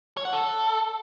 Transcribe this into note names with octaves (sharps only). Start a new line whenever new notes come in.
C#5
F#5
A4